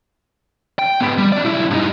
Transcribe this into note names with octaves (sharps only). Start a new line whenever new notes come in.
G5
G#2 B3
G3
C#4 D5
B1 E4
G2 D#4